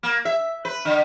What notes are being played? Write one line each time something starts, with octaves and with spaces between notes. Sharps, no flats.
A#3
E5
B4
D3